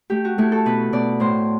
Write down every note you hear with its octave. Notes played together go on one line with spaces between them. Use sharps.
A3 G4
F#4
A3 E4
A4
B2 B4
B2 D5
A2 C5